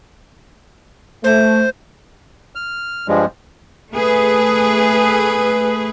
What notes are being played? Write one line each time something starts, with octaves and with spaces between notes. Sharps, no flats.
A3 C5
F6
G2 F3 G3 G#3
A3 G#4 B4